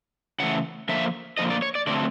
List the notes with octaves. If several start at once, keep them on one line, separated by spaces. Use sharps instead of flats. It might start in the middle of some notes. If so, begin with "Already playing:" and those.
C#3 E3 A3 F#5
D3 F3 A#3 E5
D3 F3 A#3 D#5
D5
C#5
D5
D3 F#3 A3 C4 D5